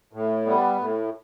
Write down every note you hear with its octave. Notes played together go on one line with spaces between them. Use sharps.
A2
G3 B3
A2